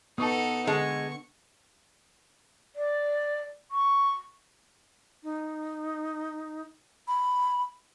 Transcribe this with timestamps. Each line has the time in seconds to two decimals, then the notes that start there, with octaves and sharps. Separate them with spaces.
0.18 B3 D#4 A4 A5 C#6 D#6
0.67 D3 G#3 F#5 A5 C#6
2.76 D5
3.71 C#6
5.23 D#4
7.08 B5